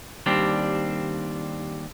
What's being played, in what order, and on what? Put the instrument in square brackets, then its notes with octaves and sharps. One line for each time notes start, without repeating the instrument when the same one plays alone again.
[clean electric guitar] D#2 G3 C4 D4